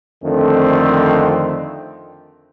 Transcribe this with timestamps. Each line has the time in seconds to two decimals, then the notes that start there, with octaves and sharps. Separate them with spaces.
0.23 F2 D3 D#3 A3 C4